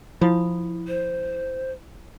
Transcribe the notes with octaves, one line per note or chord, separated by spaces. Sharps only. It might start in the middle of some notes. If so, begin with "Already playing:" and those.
F3 E4 B5 D#6
C5